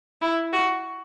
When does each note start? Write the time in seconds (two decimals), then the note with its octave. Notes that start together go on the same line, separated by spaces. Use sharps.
0.22 E4
0.53 F#4